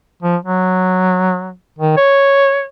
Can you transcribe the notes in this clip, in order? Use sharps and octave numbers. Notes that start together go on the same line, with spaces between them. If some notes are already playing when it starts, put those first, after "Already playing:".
F3
F#3
D#3
C#5